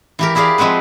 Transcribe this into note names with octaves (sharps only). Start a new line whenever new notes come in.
E3 G4 A#4
E4 G4 G#4 A#4 D5 F5
F3 G#3 C4 F#4 B4